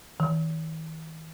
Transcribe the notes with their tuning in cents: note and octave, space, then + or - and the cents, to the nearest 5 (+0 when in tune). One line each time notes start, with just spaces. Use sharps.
D#3 +45